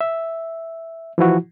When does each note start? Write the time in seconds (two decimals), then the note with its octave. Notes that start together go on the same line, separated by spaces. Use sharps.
0.01 E5
1.18 E3 F3 E4 F#4